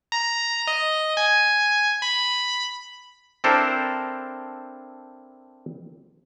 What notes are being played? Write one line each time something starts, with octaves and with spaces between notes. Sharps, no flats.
A#5
D#5
G#5
B5
C4 D4 E4 A4 A#4 C5